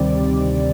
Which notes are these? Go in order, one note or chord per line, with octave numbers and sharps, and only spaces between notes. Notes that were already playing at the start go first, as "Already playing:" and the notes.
Already playing: D2 C3 D#3 G3 C4 D5